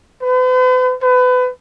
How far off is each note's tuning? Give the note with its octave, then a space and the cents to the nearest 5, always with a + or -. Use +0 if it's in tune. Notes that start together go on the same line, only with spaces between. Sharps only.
B4 +45
B4 +30